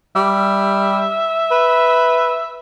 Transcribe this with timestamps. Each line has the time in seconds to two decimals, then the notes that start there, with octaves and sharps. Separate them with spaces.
0.16 G3 E5
1.51 B4